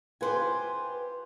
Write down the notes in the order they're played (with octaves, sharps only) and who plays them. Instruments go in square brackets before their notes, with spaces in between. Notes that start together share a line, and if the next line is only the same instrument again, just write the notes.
[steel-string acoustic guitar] F4 B4 [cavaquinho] G4 C5 G#5